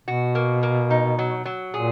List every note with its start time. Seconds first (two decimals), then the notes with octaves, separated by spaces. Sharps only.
0.08 B2 F#4
0.35 A#3
0.63 A#3
0.90 D#4
1.19 F#3
1.46 F#3
1.74 A#2 G#4